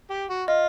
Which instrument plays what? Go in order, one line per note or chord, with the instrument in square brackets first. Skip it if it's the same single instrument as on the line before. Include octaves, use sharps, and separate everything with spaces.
[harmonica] G4
F#4
[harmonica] F4 [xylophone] D#5